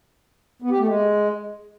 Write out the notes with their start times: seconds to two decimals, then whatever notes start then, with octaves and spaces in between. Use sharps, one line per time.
0.62 B3
0.71 G4
0.79 A3
0.87 G#3